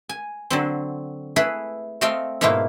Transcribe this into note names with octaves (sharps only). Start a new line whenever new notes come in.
G#5
D3 F#3 C4
A3 E4 G#4 A4 B4
A3 C4 A4 D#5 F5 G5
G#2 B2 A3 A#3 E4 F4